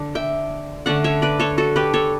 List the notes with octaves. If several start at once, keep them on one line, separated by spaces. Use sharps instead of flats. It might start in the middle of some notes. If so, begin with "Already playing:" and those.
Already playing: D3 D4
E5 G5
D3 A3 C#4 D5 F#5
C#5 E5
B4 D5
A4 C#5
F#4 A4
G4 B4
A4 C#5